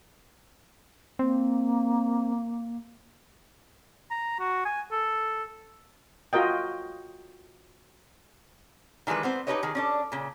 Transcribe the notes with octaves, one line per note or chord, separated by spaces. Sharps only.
A#3 C4
A#5
F#4
G#5
A4
F4 F#4 A#4 D#5 G5
D#3 E3 G3 G#3 B4
B3 C4 C5
D#4 E4 G4 B4 C#5 D#5
D#3 G#4
C#4 D4 A4
A#2 C#3